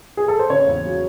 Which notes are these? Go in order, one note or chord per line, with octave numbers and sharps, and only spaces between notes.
G#4
A4
C5
C#3 C#5
E2
F#3